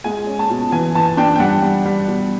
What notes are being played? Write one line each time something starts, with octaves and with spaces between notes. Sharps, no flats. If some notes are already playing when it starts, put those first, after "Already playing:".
G#3 G#5
C#4
A5
B2
E3 G#5
E3 A5
D4 G5
G5
G3 F#5
G3
G3
B2